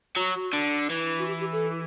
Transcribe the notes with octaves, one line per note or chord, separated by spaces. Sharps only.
F#3 F#4
D3
E3
F#4
G4
G4
A4